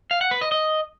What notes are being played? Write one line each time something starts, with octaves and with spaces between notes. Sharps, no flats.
F5
F#5
B4
D#5
D#5